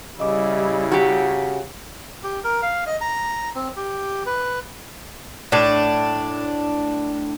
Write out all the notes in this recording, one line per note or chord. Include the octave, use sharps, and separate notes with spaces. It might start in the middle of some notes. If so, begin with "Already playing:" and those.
C#3 G3 E4 D#5 D6
F#4 G4 A#5 G6 B6
G4
A#4
F5
D#5
A#5
C4
G4
B4
A2 D4